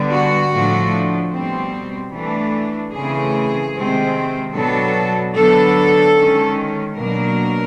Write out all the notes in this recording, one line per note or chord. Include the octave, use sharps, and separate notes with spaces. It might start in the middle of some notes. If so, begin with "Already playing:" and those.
Already playing: D3 G3 B3 D4
F#4
A2 F3 A3 D4
B2 G3 C4
E3 A3 D4
C#3 E3 A3 C4 G#4
C3 D#3 G#3 C4
B2 F#3 B3 D4 A4
D3 F#3 B3 D4 A4
D#3 G#3 C#4
B2 F#3 A#3 D4 A#4